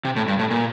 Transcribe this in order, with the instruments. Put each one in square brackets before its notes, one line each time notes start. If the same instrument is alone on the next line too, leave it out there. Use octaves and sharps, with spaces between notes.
[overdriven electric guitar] C3
A2
G2
A2
A#2